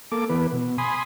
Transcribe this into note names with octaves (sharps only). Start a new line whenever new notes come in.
A#3 A4 D6
E3 B3 B4
B2
G#5 B5 C6 D#6